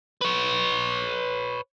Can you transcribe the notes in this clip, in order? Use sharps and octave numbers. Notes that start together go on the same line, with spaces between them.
B4 C#5